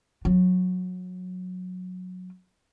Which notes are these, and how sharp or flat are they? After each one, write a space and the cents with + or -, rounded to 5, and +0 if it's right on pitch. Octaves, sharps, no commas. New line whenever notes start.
F#3 -20